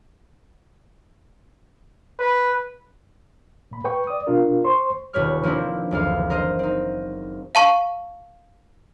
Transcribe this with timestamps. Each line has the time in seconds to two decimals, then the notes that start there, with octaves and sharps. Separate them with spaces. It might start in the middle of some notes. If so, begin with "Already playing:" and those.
2.19 B4
3.71 A#2 B5
3.84 B4 G5 C#6
4.07 D5 D#6
4.27 B2 D4 F4 A#4
4.64 C5 C6 C#6
5.13 D#1 B2 B4 C#5 C#6 F6
5.43 F3 A#3 C4 D4 E4
5.91 F#1 D2 E3 F5
6.30 A#4 C5 D#5
6.59 C4 D#4
7.55 F5 A5 C#6